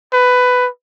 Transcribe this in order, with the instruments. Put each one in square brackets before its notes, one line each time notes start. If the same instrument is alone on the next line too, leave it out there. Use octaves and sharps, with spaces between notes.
[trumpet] B4